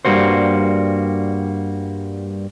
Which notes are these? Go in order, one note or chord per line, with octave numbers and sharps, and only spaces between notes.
G2 E3 G3 A#3 F#4 C5